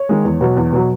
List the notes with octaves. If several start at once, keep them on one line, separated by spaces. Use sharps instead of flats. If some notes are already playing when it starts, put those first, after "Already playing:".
Already playing: C#5
D#3 G#3
E2
B2 F#3
E2
B2 F#3